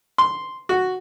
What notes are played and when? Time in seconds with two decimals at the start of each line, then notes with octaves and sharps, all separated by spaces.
0.18 C6
0.69 F#4